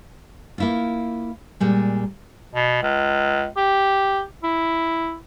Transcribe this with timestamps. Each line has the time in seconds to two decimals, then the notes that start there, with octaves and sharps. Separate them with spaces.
0.58 A#3 E4 F4
1.60 A#2 G3 G#3
2.55 B2
2.82 C#2
3.57 G4
4.43 E4